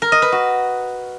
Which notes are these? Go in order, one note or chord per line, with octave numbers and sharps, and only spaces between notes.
A#4
D#5
B4
F#4